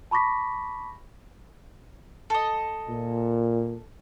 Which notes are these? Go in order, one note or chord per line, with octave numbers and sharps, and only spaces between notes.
A5 B5 C#6 D6 A#6 B6
A4 D#5
A#2